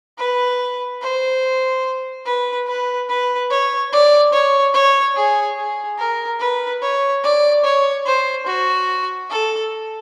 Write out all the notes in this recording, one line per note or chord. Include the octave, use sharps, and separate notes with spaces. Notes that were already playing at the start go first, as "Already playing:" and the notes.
B4
C5
B4
B4
B4
C#5
D5
C#5
C#5
G#4
G#4
A#4
B4
C#5
D5
C#5
C5
F#4
A4